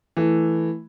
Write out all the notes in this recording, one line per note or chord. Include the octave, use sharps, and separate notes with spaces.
E3 A3